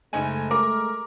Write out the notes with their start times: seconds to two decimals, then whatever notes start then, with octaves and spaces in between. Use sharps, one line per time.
0.13 F#1 G#3 A3 D#4 G#5
0.51 A#4 D6